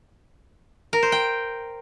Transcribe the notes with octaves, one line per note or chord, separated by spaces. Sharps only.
A#4
C5
G5